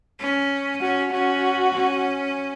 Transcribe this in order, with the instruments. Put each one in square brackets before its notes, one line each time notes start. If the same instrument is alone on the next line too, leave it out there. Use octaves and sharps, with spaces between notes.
[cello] C#4
[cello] C#4 [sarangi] F#4
[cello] C#4 [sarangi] F#4
[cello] C#4